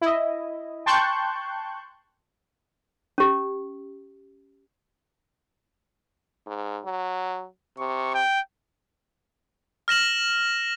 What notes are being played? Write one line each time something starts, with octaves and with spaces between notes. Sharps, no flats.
E4 D#5
G5 A5 C6 C#6 F#6 G6
C#4 G4
G#2
F#3
C3 C#6
G5
F6 A#6 E7 F#7